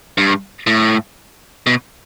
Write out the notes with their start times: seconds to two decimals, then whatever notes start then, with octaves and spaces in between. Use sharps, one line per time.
0.18 G2
0.67 A2
1.67 B2